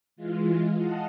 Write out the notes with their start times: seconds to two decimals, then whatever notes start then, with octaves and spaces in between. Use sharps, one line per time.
0.16 E3 G#3 F4
0.72 D#5 F5 F#5 A5